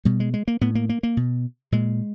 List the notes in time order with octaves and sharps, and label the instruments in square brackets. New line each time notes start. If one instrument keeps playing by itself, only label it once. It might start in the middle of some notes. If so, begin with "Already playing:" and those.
[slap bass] B2 G3
G#3
G#3
A#3
A2 B3
A#3
A#3
A#3
B2
A#2 G#3